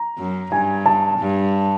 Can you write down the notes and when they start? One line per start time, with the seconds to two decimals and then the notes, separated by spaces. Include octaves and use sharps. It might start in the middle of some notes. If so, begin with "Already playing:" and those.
Already playing: A#5
0.18 F#2
0.52 G2 G#5
0.86 A5
1.19 G2